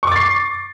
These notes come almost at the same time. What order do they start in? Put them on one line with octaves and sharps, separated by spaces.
C#6 D6 A6 C7